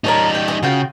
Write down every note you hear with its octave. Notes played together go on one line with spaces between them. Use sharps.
G3 D#4 A#4 C#5 A5
G5
D#5 G#5
C#3 F4 F#4 G5